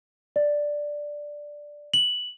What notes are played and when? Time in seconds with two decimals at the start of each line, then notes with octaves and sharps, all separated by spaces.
0.36 D5
1.94 F#7